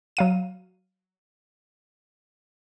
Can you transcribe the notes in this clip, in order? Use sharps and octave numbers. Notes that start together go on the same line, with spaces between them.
F#3 F5 D#7